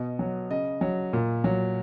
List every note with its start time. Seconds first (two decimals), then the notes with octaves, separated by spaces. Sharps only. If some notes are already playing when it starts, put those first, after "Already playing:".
Already playing: B2 D#5
0.19 F#3
0.50 C#3 D#5
0.81 F#3
1.13 A#2
1.44 F#3